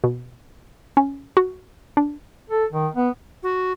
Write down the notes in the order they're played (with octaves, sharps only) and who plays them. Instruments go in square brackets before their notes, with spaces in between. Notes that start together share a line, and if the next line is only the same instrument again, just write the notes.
[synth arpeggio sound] B2
C#4
F#4
D4
[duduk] A4
D#3
B3
[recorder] F#4